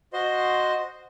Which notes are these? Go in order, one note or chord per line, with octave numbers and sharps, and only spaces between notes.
F#4 C5 D#5 C6